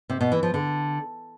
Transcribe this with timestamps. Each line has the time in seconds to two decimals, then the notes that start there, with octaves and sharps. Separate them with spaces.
0.09 C3
0.21 B2
0.32 E3
0.43 F3
0.54 D3